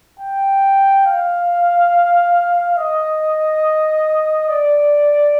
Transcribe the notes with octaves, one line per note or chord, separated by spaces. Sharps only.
G5
F5
D#5
D5